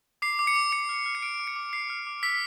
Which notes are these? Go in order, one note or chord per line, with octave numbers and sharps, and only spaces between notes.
D6 C7
D6
C#7
D6
D6 C#7
F6
F6
C#7
F6 D7
D6
C#7
D6
F6 C7
F6
D6
E6 B6